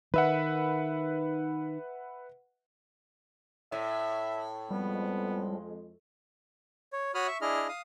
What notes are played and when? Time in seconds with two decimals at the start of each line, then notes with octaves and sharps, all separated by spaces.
0.14 D#3 B4 E5 F#5
3.72 A2 E5
4.71 F2 G3 G#3 B3
6.93 C#5
7.14 F#4 C#5 B5 D#6 F6
7.27 E5 C#6
7.41 D4 E4 G#4 D#5 F6
7.68 F5 D#6